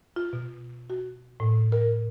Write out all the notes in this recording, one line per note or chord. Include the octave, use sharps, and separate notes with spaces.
F4
B2
F#4
A2
A#4